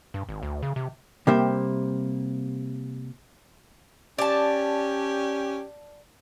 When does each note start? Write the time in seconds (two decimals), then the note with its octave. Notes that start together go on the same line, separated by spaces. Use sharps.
0.14 G2
0.29 G#1
0.43 D2
0.63 C#3
0.76 C3
1.27 C3 G3 A#3 G4 C5 E5
4.18 C#4 G4 D5 A5